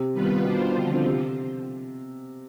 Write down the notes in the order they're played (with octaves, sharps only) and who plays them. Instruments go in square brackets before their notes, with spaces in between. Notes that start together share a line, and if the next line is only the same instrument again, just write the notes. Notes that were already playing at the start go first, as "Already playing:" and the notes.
Already playing: [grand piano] C3
[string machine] D#3 G3 B3 F4 B4
[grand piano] B2 [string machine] D#3 G3 D4 F4 C5
[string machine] D3 F3 C4 F4
[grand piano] C3